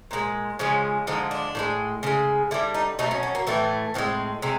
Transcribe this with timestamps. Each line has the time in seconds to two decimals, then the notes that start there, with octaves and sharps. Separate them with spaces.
0.11 A#2 F3 G#3
0.59 C#3 F3 G#3 C#4
1.07 D3 F3 G#3 D#4
1.31 D4
1.55 A2 E3 G#3
2.03 C#3 F3
2.06 G#3
2.51 D3 G3 E4
2.74 D#4
2.99 B2 F#3 A3 D#4
3.11 C#4
3.23 C#4
3.35 A#3
3.47 A2 E3 A3 B3
3.94 A2 F3 G#3 C4
4.42 C3 G#3